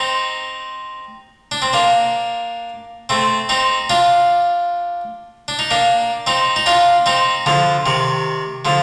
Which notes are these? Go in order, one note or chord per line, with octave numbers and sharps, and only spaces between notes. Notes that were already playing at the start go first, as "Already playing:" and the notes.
Already playing: C4 D#4
D4
C4
A#3 D4
A3 C4
C4 D#4
D4 F4
D4
D#4
A#3 D4
C4 D#4
D#4
D4 F4
C4 D#4
D3 F3
C3 D#3
D3 F3